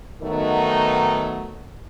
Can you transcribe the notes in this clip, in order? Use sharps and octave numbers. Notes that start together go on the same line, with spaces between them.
D#3 F#3 A3 B3 D#4